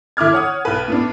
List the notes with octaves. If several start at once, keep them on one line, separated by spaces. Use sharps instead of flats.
D3 E4 D6 F6 G#6
C#5 F#5 D#6
B1 B4
A2 B3 D4